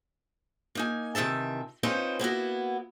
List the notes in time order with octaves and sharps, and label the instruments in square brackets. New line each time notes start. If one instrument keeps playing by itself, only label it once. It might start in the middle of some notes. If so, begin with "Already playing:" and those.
[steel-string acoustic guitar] A#3 D#4 G#5
C3 D#3 E3 E5 A5
C4 C#4 D#4 F4 B4 C5
A#3 B3 E4 F#4